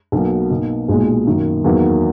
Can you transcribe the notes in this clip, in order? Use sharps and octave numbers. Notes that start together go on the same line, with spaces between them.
B1 B2 F#3 A#3
B2 A#3 D#4
B1 A#2 G#3
F#2 D#3 A#3
E2 D#3 F#3 A#3